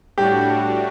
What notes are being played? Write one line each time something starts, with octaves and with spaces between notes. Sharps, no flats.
A2 G3 D4 F#4 G4